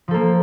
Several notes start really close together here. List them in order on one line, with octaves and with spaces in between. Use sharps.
F3 A4 A#3